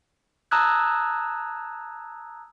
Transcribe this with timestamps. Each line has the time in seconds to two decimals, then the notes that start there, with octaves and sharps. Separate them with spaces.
0.51 A5 A#5 D#6 E6 F#6 G#6